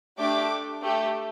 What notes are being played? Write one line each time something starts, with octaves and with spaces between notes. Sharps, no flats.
A3 D4 G4 D6
A3 G4